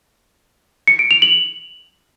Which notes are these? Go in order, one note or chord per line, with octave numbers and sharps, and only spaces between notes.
C#7
D7
F7
F#7